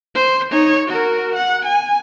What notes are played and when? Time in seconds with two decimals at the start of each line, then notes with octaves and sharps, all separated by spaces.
0.15 C5
0.51 D#4 C#5
0.88 F#4 A#4
1.36 F#5
1.65 G#5